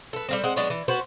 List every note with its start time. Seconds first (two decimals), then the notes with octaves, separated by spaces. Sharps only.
0.13 A4 B4
0.29 G3 A#3 C4
0.44 G#3 C4 F#5
0.56 F#3 G#3 B3 D4
0.70 E3
0.88 B3 F#4 B4 C5